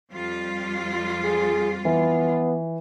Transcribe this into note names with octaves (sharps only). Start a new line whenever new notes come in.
F2 G3 F4
G#4
E3 B3